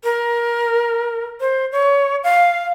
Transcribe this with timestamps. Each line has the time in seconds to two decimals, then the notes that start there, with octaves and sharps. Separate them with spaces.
0.04 A#4
1.40 C5
1.72 C#5
2.24 F5